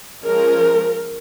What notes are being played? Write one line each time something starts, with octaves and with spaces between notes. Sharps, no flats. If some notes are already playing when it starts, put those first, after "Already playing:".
F3 G#3 C#4 A#4